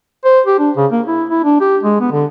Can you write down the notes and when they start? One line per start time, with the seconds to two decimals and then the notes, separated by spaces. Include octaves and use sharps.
0.25 C5
0.46 G4
0.59 D4
0.77 C#3
0.92 A#3
1.07 E4
1.30 E4
1.44 D4
1.61 G4
1.83 G#3
2.00 B3
2.12 D3